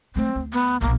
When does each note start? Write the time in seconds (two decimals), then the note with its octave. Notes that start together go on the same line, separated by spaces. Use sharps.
0.16 G3 A3 C4
0.35 D2
0.53 B3
0.81 B1 A#2 A#3